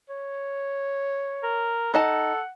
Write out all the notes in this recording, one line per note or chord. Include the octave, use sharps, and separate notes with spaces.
C#5
A#4
D#4 A4 D#5 F#5 A5